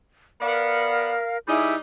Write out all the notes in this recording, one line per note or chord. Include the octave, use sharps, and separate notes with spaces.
B3 A#4 D5 F5
G3 D#4 E4 G#4 G#5